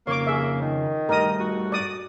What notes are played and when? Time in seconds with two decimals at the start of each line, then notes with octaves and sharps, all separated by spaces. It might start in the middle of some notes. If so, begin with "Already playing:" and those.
0.07 F2 C#3 A#3 C#5 D6
0.27 G#4 E5
0.62 D#3
1.09 G2 A3 A#4 D#5 D#6
1.40 F#4
1.72 D5 D#6